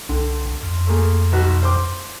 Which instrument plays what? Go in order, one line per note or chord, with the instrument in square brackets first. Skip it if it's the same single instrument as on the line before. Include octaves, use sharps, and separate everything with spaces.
[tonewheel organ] C2 [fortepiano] D3
[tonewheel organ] F2
[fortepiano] A3 A#3 G#4
B1 B2 F#4
C5 C6 D6